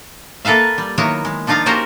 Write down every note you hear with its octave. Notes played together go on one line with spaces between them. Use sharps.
A#3 A4 B4 E5 F5
G3
D#3 F#3 A#3 B3 E4 C#5
G#3
F3 D4 D#4 F4 F5 A#5
A#3 C#4 F#4 G4 A#4 C5